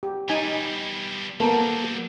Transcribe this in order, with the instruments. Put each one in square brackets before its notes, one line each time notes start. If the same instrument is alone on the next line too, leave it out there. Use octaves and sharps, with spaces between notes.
[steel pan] G4
[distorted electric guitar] B2 G3 [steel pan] D#4 G#5
[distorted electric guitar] F#3 G3 [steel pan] A#3 B3 [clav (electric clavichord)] A4 A#4